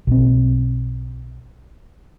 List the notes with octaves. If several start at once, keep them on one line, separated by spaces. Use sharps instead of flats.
B1 C4